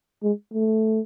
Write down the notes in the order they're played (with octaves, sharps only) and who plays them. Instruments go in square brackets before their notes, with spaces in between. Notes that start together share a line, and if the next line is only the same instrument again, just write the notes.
[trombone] G#3
A3